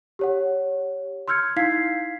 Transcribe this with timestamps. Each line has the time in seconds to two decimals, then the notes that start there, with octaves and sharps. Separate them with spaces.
0.19 G4 C#5 F#5
1.28 C6 E6 F6 G6 G#6 C#7
1.56 D#4 E4 F5 G#6 B6 C7